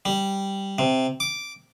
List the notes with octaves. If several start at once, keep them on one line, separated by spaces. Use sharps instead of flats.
G3
C3
D6